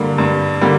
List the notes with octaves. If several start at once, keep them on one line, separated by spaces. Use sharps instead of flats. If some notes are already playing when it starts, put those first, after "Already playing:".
Already playing: G2 D3 G3 A#3
G2
D3 G3 A#3